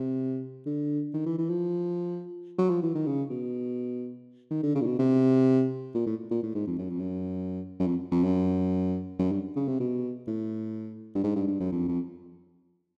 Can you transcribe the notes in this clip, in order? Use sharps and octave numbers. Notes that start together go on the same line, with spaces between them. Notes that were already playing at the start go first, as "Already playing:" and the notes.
Already playing: C3
D3
D#3
E3
E3
F3
F#3
F3
E3
D#3
C#3
B2
D#3
D3
C#3
A#2
B2
C3
A#2
A2
A#2
A2
G#2
F2
F#2
F2
F#2
F#2
F2
F2
F#2
F#2
G2
C#3
C3
B2
A2
G2
G#2
G2
G2
F#2
F2
F2